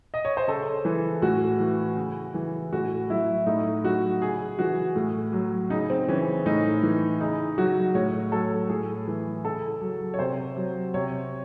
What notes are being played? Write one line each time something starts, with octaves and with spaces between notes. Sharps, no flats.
D#5
C#5
C5
C#3 A4
E3
A2 F#4
E3
C#3
E3
A2 F#4
F#3 E4
A2 D#4
F#3 F#4
C#3 G#4
E3 F#4
A2
F#3
C#3 D#4
C4
E3 C#4
A2 D#4
E3
C#3 D#4
F#3 F#4
A2 C#5
F#3 A4
A2 G#4
E3
C#3 A4
F#3
C#5
C3 C5
F#3
C3 C#5